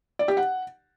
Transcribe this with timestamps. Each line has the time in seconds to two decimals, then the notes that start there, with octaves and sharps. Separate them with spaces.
0.19 D5
0.28 G4
0.37 F#5